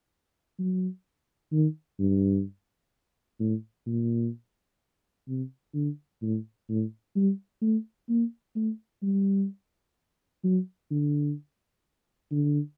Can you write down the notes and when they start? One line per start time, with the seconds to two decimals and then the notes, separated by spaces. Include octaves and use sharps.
0.59 F#3
1.52 D#3
2.00 G2
3.40 A2
3.87 A#2
5.28 C3
5.74 D3
6.22 A2
6.69 A2
7.16 G3
7.62 A3
8.09 A#3
8.56 A3
9.03 G3
10.44 F#3
10.91 D3
12.31 D3